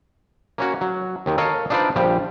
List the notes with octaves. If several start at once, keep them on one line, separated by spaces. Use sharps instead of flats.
A#3 C#4 F#4
F#3
D#2 D#3
A4 A#4 C#5 D#5 F5
D4 D#4 F4 B4 C5 D5
A#1 F3 G3 G4